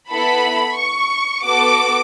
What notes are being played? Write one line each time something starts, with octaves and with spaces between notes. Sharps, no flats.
B3 E4 A4 B5
C#6
B3 F#4 A4 D6